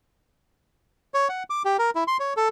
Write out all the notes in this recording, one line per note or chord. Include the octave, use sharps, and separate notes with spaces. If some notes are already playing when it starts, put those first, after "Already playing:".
C#5
F#5
D6
G4
A#4
E4
C6
C#5
A4